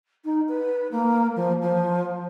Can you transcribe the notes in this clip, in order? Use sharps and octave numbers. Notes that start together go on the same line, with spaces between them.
D#4
B4
A#3
F3
F3